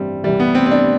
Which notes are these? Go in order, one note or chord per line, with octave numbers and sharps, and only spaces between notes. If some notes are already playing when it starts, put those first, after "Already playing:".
Already playing: A1 G2 E3 G3 C4
C2 C3 E3 G3
B3
C4
C4
D4